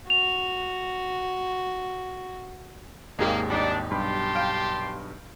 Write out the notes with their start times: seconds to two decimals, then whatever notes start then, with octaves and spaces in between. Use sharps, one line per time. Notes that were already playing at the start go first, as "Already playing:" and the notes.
0.10 F#4 F7
3.19 G#1 D#2 G#3 A#3 G4 G#4
3.50 G3 D4 D#4
3.91 B1 G2 G4 A5 B5 C6
4.35 F5 G5